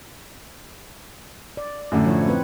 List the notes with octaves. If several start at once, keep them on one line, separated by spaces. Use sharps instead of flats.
D5
F#2 A2 D3
F3 E4 C#5
C4 B4